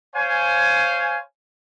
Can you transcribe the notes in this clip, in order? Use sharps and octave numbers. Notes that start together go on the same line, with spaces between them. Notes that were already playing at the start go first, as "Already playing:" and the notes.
C5 C#5 F5 G#5